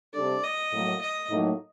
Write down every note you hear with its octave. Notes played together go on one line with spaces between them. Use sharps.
C3 G3 D4 A4 D5
D#5
A2 F#3 A#3
D#5
A2 F#3 A#3 D#4